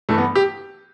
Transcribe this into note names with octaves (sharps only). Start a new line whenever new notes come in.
G2 E3 A3
B3
G4